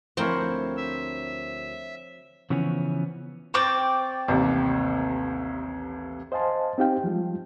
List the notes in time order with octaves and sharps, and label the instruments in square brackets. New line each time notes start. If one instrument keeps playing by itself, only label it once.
[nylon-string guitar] D2 E4 A#4 [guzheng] F3 C4 G5 [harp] C5 C#5
[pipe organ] E5
[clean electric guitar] C#3 E3 F3 B3 C#4
[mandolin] C4 D5 G5 [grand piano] C#6 D6
[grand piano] A1 D#2 C3
[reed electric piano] C5 D#5 F5 G#5 A5 C6
C4 D#4 G4 F5 G5
F3 G3 G#3 F4